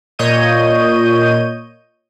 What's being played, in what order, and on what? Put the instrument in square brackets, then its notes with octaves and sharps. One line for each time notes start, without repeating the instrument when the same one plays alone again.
[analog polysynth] A#2 C#5 D#5 G6 D#7